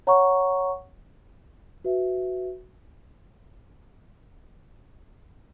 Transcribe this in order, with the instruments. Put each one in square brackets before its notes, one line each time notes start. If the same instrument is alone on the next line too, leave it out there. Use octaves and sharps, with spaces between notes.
[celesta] C#5 F#5 A#5 C#6
F#4 B4 E5